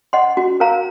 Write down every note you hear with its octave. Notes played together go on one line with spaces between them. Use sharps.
D#5 F#5 C6
F#4
A#4 F5 A#5